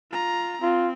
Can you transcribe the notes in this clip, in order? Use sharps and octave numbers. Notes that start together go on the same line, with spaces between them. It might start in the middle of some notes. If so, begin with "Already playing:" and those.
F4 A#5
C4 F4